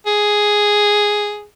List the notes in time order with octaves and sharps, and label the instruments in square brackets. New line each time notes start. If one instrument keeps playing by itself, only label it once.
[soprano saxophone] G#4